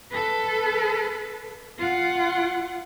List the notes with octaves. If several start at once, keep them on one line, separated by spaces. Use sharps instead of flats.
A4 B4
F4 F#5